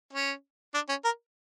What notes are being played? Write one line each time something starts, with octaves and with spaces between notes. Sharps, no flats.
C#4
D4
C#4
A#4